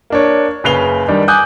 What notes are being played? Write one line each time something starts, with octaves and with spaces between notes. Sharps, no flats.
A#3 D4 C#5
F#1 C#3 B4 C7 F7 G7
D#3 G3 D4
G#5 D6 D#6 F#6 G6